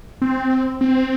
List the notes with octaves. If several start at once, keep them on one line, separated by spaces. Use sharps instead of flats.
C4
C4